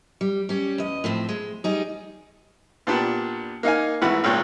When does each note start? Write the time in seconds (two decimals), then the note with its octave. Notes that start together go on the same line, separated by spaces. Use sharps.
0.21 G3
0.49 G3 C#4
0.78 E2 D#5
1.04 A2 F3 C4
1.29 G#3
1.64 G3 D#4 G#4
2.87 A#2 B3 D4 G4
3.63 A#3 D#4 F5 G#5
4.02 G#1 E3 A3 F#5 B5
4.24 G#1 C#2 A#2 C#5 G5